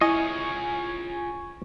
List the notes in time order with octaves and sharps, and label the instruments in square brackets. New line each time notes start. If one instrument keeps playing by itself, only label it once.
[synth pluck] E4 [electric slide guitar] F4 G#4 C#5 [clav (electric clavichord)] D#5 [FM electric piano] G#5 C#6 G#6